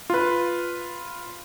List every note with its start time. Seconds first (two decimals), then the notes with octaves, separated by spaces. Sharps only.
0.10 F4 B4